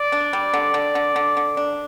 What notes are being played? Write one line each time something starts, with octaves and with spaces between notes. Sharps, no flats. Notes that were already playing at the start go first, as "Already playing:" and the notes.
Already playing: D5
D4
G3
D3
D3
D3
D3
D3
D4